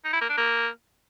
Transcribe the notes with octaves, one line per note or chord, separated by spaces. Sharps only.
D#4
E4
A#3
D4
A#3